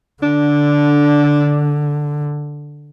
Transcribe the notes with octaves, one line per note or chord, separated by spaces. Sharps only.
D3 D4